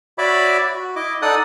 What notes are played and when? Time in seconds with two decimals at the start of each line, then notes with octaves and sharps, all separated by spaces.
0.18 F#4 C#5 D5 E5 B5 D6
0.74 F#4
0.96 E4 D#5 D6
1.22 D#4 A4 D5 F#5 D#6 F#6